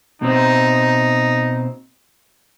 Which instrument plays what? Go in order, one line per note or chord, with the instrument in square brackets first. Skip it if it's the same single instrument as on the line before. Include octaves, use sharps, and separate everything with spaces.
[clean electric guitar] B2 C4 [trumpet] D#4